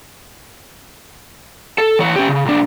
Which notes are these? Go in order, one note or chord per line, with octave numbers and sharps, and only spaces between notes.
A4
E3 C#5
C#4 G4
C#3
B1 D4